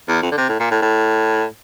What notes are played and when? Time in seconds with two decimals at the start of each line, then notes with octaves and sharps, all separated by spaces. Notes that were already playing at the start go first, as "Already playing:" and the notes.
0.08 E2
0.22 F2
0.32 D3
0.37 C3
0.49 A2
0.60 A#2
0.71 A2
0.82 A2